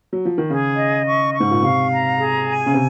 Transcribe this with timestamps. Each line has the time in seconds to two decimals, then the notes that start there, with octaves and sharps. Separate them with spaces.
0.13 F#3
0.25 F3
0.38 D#3
0.50 C#3 G#4
0.78 D#5
1.06 C#6
1.34 C#6
1.40 G#2
1.51 A#2
1.62 C3 F5
1.91 A#5
2.18 G#4
2.47 G#5
2.66 C#3
2.74 C3